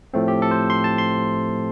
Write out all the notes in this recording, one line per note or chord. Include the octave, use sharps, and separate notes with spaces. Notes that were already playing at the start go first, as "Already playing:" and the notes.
A2 F3 A3 C4
G4
A4
C5
C6
A5
C6